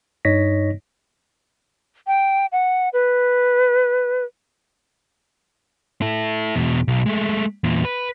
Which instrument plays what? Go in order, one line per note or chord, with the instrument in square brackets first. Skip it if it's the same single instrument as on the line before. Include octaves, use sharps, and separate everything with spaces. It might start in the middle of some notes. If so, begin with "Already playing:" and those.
[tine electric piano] G2 D#4 C#5 D#5 A#6 B6
[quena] G5
F#5
B4
[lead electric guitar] E4 A4
E2 B2
B1
G#3 A3
E2 A#2
B4